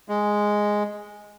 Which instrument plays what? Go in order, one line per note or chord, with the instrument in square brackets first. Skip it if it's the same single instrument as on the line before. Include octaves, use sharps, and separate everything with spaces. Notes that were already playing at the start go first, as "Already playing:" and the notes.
[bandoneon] G#3